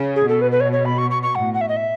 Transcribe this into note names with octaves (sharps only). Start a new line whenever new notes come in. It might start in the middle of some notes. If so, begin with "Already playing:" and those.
Already playing: C#3
G#4
B2
A4
B4
B4
C#5
C#5
B5
C#6
C#6
C#6
A2 F#5
F#5
E5
D#5
E5